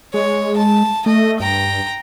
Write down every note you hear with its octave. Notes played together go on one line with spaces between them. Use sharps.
G#3 C#5
A5
A3 D#5
G2 G5 A#5